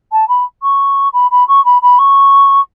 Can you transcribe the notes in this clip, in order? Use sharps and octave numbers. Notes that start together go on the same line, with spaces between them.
A5
B5
C#6
B5
B5
C#6
B5
B5
C#6